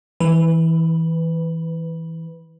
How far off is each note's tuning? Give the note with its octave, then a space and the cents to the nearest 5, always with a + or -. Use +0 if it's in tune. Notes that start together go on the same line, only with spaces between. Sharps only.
E3 -20 B4 +15